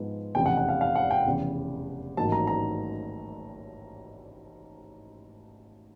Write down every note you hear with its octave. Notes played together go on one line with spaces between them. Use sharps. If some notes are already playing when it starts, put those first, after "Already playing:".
Already playing: G#2 F3 G#3 B3
F1 E2 C#3 G5
F#5
F#5
F5
F5
F#5
G5
F1 E2 C#3
A1 G#2 D#3 F#3 A#3 A5
A#5
A#5